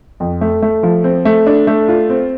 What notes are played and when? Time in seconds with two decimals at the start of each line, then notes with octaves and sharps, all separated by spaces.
0.20 F2
0.41 A3
0.63 A3
0.83 F3
1.04 C4
1.25 A3
1.47 D4
1.67 A3
1.89 F4
2.09 C4